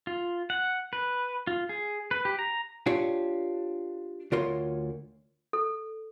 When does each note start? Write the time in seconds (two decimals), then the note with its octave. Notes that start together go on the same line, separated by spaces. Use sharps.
0.07 F4
0.50 F#5
0.93 B4
1.47 F4
1.69 G#4
2.11 B4
2.25 G4
2.39 A#5
2.86 D4 F4 G4 C#5
4.32 D2 F4 A#4 C#5 C6
5.53 A4